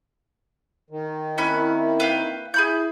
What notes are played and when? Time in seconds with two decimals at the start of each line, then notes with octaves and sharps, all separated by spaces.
0.90 D#3
1.38 A#3 C4 C#4 E4 B5 F#6
2.00 B4 F5 G5
2.54 E4 G#4 B5 G6